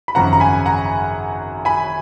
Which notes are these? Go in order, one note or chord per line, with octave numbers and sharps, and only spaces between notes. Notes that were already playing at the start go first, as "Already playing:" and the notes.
B5
G#1 F#2 C#3 F3 F#5 A#5
A#5
G#5 B5
F#5 A#5
G#5 B5